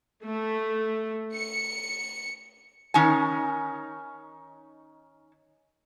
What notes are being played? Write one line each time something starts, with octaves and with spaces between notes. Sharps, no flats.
A3
C#7
D#3 C#4 D#4 G#5